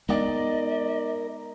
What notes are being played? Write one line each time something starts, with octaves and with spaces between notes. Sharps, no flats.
G#3 B3 D#4 A#4 D5 D#5